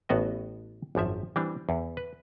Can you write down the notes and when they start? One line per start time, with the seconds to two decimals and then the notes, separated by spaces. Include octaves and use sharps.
0.09 A1 A2 B3 F#4 D#5
0.95 G#1 F#2 F3 E5
1.36 E3 G3 C4 D4
1.69 E2
1.97 B4